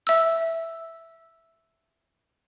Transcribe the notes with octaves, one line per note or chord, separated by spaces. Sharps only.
E5 E6